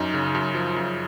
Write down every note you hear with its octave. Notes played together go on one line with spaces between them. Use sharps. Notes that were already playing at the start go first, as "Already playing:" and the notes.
Already playing: F#2 D#4
C#3
F#2
F3
F#2